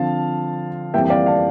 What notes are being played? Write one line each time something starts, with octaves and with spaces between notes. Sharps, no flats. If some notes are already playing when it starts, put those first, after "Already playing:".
Already playing: D3 F3 C4 F5 A5
F2 E3 G3 A#3 E5 G5
G5
D5 F5
F5 A5